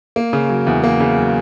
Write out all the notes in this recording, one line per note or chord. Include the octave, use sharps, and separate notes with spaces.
A#3
C#3
F#3
E2
A#3
C#3
F#3